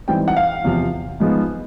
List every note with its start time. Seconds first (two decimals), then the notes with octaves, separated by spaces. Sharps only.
0.08 G#2 E3 G3 C4 G5
0.28 F#5
0.37 F5
0.64 E2 C3 F3
1.20 G#2 F3 G#3 B3